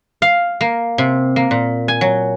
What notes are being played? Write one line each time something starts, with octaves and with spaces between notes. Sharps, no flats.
F5
A#3
C3
A#3
A#2
G#5
F#3